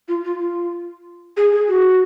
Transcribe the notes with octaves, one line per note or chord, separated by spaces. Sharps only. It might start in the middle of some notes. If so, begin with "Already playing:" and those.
F4
F4
F4
G#4
G#4
F#4